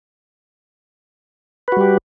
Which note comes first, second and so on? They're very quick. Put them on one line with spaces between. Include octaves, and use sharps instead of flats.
B4 F#4 G3 G4